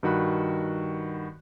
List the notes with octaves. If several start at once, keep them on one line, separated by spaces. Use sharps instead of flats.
G2 D#3 F#4 B5 F#6